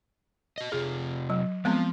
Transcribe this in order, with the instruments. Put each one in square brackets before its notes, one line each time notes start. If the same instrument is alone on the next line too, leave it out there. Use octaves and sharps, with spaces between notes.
[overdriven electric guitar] F#4 D#5
[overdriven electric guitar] C3 F4 [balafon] G#4
[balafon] F#3
[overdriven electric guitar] F3 [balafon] G#3 B3 C4